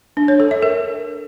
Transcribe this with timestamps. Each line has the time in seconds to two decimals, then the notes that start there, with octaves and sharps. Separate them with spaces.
0.17 D4
0.28 C#5
0.40 A4
0.51 E5
0.62 A#4